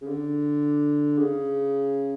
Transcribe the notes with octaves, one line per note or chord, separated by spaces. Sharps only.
C#3
D3
C#3